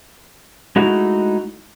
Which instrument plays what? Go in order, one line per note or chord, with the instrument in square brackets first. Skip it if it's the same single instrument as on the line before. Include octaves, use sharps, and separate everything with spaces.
[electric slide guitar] G#3 A3 D#4 E4 F#4